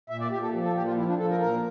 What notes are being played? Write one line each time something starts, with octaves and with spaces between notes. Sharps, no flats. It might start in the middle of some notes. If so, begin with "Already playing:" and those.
A#2 E5
D5
A#2 G4
A4
F3
A4
A#2 G4
F4
F3 E4
D4
F3 A4
A#4
A#2 A#4